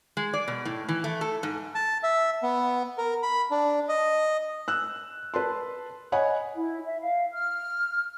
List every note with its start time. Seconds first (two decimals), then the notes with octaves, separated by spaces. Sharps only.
0.17 G#3
0.33 D5
0.48 B2
0.65 A2
0.89 E3
1.04 A3
1.21 A4
1.43 G#2
1.75 A5
2.03 E5
2.43 B3
2.98 A#4
3.23 B5
3.51 D4
3.89 D#5
4.68 E6 F#6
5.34 B4 A5 C6
6.12 C#5 D#5 F#5 G#5 B5
6.56 E4
6.85 E5
7.01 F5
7.32 F6